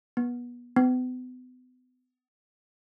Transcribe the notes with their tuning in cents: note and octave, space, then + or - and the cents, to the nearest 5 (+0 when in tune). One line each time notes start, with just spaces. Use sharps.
B3 -25
B3 +40